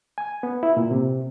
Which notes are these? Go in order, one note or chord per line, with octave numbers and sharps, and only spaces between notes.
G#5
B3
E4
A#2
C3